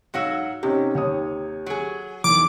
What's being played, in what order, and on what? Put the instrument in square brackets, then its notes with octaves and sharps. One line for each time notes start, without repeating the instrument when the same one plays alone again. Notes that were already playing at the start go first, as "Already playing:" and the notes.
[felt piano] G#2 F5 E6 [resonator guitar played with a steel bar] F#3 F#4 C#5
[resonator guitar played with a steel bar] C3 [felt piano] C4 C#4 D#4 [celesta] G4
[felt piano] D#2 C#5 D#6
[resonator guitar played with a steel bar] F#3 G#4
[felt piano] E2 D#3 [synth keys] D6